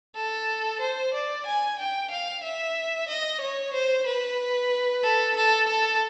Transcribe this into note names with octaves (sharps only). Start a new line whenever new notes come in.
A4
C5
D5
G#5
G5
F5
E5
D#5
C#5
C5
B4
A4
A4
A4